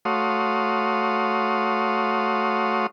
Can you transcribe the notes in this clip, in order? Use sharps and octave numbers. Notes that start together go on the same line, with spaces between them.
A3 F#4 C#5 F5 C6 D#6